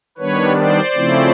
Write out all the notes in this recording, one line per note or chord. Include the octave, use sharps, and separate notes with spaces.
D#3 G3 B3 D4 B4 C#5
C5 D5
C#3 F3 A3 C4 E4